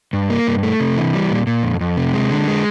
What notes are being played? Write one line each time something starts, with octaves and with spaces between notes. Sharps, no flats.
G2
A#3
G2
A3
C3
E3
G3
A#2
A#2
F2
F2
C3
G#3
D3
G#3